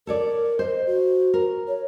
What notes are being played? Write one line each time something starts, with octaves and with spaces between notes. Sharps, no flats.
A4 A#4 C#5 D5
C5 D#5
F#4
A#4
C#5